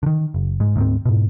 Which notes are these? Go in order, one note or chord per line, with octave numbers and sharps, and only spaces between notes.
D3 D#3
F#1
G#2 G#3
D2 G#2 C4
G#2 B2